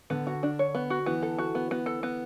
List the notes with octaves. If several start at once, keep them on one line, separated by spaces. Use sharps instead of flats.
D3 B3
F#4
D4
C#5
B3
F#4
E3 B3
A4
F#4
B3
B3
A4
B3